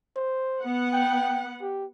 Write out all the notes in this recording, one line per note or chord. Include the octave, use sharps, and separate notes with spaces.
C5
B3 F#5
G5
G4